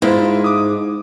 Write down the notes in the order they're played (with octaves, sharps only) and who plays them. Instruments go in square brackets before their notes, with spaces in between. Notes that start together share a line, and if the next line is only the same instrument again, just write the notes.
[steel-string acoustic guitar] G#2 [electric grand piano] E4 F4 E5
[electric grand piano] D6 D#6